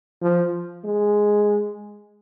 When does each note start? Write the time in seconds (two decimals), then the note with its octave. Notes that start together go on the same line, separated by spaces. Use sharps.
0.22 F3
0.85 G#3